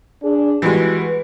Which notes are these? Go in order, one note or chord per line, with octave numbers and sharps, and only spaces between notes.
D4 G#4
E3 G3 G#3 F#4 B4